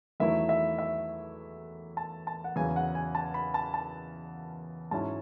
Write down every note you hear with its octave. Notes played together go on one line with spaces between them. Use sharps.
E2 D#3 F#3 A3 E4 E5
E5
E5
A5
A5
F#5
E2 C#3 F#3 G#5
F#5
G#5
A5
B5
A5
A5
G#2 F#3 C#4 E4 A5